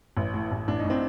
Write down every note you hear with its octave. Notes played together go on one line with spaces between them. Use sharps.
A1
A2
A1
A1 D4
D#4
A2
C4 D4